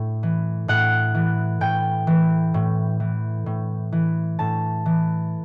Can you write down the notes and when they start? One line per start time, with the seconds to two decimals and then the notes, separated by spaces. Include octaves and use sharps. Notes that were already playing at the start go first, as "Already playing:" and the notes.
Already playing: A2
0.23 E3
0.68 A2 F#5
1.15 E3
1.61 A2 G5
2.07 E3
2.54 A2
3.00 E3
3.46 A2
3.92 E3
4.39 A2 A5
4.86 E3